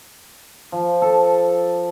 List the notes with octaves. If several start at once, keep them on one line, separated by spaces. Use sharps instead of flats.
F3
A4